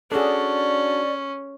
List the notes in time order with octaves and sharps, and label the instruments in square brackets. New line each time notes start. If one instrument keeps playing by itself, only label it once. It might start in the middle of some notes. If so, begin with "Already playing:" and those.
[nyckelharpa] C#4 [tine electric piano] D4 F#4 [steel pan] G#4 A4 [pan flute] D5